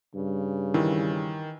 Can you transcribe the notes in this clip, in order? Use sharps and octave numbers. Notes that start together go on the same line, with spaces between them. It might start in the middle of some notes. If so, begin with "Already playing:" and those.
G2 C#3
D#3 E3